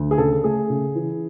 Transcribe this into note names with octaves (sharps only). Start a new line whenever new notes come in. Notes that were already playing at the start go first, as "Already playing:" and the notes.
Already playing: D2
G#4
C#3 A4
A3 G#4
C#3
E3